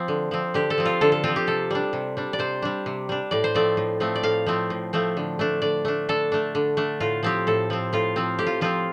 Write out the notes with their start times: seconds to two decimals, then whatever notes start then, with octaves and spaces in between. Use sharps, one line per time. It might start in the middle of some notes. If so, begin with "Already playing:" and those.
Already playing: F3 C4
0.08 D3
0.31 F3 C4
0.54 D3 G4
0.70 A4
0.78 F3 C4
0.85 F4
1.01 D3 A4
1.12 A4
1.24 F3 C4 F4
1.36 G4
1.47 C3 A4
1.70 G3 D4
1.93 C3
2.17 G3 D4
2.33 D5
2.39 C3 C5
2.62 G3 D4
2.86 C3
3.09 G3 D4
3.31 A2 D5
3.44 C5
3.55 F3 A3 C4 D5
3.77 A2
4.00 F3 A3 C4
4.15 D5
4.23 A2 F5
4.46 F3 A3 C4
4.70 A2
4.93 F3 A3 C4
5.17 D3
5.39 A3 D4
5.62 D3 D5
5.85 A3 D4
6.09 D3 A4
6.32 A3 D4
6.55 D3
6.77 A3 D4
7.00 A2 F4
7.23 F3 C4 G4
7.47 A2 A4
7.70 F3 C4
7.93 A2 F4
8.16 F3 C4
8.39 A2 G4
8.47 F4
8.61 F3 C4 F4